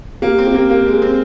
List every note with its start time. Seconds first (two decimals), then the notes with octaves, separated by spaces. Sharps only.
0.22 A#3 G4
0.38 C4
0.47 G4
0.54 A#3
0.70 A#3 A#4
0.86 G#3
0.94 A#4
1.02 C4